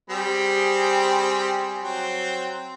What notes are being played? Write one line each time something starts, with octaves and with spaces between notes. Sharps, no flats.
G3 C4 G#4
F#3 C4